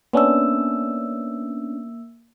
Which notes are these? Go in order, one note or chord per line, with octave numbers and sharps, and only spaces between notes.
A#3 B3 C#4 D4 E6